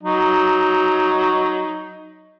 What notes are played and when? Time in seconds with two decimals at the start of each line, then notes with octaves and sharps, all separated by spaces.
0.03 F#3 D#4